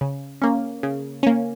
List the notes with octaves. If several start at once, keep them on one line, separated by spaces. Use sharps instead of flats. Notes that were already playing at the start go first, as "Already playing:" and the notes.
C#3
A#3 C#4
C#3
A#3 C#4